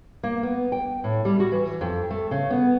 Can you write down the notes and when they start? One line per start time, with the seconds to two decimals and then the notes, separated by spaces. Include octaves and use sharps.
0.23 A#3
0.43 B3
0.72 G5
1.04 A2
1.25 G3
1.40 F#4
1.52 E3
1.81 F2
2.11 A3
2.31 C#3
2.50 B3